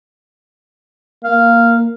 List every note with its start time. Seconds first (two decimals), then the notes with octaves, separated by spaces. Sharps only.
1.24 A#3 F5